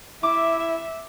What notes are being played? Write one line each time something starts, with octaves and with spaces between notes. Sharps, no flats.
E4 E5 D6